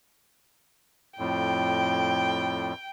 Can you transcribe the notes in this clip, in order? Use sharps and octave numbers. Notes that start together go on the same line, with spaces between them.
F2 A2 G5